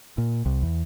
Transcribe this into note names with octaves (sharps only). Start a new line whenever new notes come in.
A#2
C2
E2